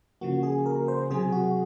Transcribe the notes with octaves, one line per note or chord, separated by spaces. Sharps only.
C#3 F3 A#3 F#4
G#4
A#4
C5
C3 F#3 C4 G#4
F#4